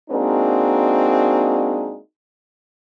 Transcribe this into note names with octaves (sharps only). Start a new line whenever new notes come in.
G#3 A#3 C4 D4 D#4 F#4